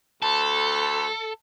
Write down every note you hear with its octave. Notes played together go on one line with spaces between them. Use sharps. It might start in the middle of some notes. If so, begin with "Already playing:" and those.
D2 A4